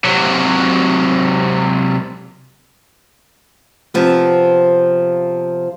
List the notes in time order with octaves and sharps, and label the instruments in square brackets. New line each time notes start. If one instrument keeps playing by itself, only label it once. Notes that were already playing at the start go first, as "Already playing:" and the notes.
[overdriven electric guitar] C3 F#3
[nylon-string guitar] C3 F3 B3